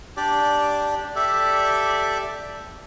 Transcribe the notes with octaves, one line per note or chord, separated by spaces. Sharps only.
D4 G4 D5
G4 A4 D5 E5